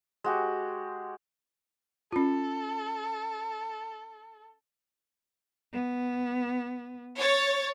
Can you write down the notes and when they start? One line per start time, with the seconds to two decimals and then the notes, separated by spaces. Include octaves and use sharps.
0.24 G#3 F#4 G4
2.12 C#4 F4 A4
5.73 B3
7.20 C#5 A6